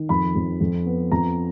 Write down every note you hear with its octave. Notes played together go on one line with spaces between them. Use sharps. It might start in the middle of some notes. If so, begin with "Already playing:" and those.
Already playing: D#3
F2 B5
F2
F2
B3
F2 A#5